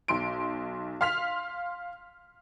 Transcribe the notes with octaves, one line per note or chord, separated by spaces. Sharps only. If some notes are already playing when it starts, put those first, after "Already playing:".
B1 C6 D7
F5 C6 F6 B6 F7